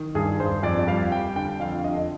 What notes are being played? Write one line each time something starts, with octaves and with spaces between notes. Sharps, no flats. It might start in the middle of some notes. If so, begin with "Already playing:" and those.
Already playing: D#3
G2 G#4
G2 C5
F2 D5
G3 F5
G3 G5
D3 G5
F2 F5
D3 D#5